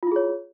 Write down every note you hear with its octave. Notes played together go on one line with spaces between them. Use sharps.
E4 F4 G#4 C#5